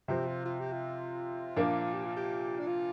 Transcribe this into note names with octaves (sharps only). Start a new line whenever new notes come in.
C3 F3 C4 G4
F4
F4
G4
F4
A#2 F3 A#3 D4
G4
F4
G4
D4
F4